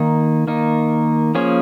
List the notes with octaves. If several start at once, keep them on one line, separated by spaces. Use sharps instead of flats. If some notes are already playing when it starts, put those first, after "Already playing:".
Already playing: D#3 A#3 D#4
D#3 A#3 D#4
F3 A#3 C#4 G#4 C#5